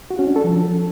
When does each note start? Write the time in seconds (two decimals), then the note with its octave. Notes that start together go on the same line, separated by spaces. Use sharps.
0.10 F#4
0.19 C#4
0.27 D4
0.36 A4
0.44 F3